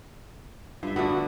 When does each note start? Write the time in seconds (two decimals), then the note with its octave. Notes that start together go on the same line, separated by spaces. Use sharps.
0.83 G2 F4 E5
0.96 D3 A3 B3 F#4